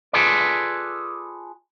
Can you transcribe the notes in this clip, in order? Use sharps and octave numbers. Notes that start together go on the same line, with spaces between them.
F4 G#4 A4 B4 D5